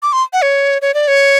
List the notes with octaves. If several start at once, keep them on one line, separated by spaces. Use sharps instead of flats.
D6
C6
F#5
C#5
C#5
D5
C#5